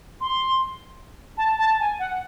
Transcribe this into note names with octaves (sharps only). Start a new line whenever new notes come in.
C6
A5
A5
G#5
F#5